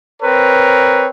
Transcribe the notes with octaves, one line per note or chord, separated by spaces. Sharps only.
C4 A#4 B4 C#5